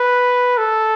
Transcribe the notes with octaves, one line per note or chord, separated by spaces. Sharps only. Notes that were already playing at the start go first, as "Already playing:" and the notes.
Already playing: B4
A4